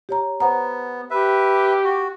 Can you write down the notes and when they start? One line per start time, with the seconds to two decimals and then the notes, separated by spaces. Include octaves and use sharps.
0.09 G4 C#5 A#5
0.40 B3 C5 F#5 A#5
1.10 G4 B4 E5
1.84 F#4